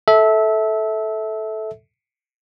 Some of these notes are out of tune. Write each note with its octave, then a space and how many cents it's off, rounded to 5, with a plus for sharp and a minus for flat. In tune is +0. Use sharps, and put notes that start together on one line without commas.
A4 -10 E5 -20